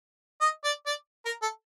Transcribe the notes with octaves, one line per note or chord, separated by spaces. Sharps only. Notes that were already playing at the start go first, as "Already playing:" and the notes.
D#5
D5
D5
A#4
A4